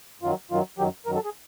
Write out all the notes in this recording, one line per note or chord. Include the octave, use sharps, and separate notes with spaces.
F#2 D#3 F#3 F4
F#2 D#3 F#3 F4
F#2 D#3 F#3 G4
F#2 D#3 F#3 A#4
A4
G#4